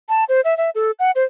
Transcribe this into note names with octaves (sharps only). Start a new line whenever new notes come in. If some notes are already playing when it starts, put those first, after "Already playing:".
A5
C5
E5
E5
A4
F#5
C5